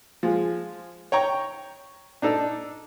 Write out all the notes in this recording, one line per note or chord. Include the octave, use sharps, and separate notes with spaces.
F3 G#3
C#5 G5 A#5 C#6
D4 D#4 A4 D5